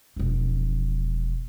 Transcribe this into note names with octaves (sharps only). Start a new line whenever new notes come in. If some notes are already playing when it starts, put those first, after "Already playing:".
E1 F3